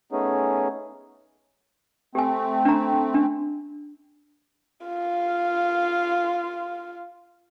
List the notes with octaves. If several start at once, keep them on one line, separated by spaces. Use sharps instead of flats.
A3 B3 C#4 D#4 G#4
A3 C4 G4 G#5
D4 A#5
D4
F4 F5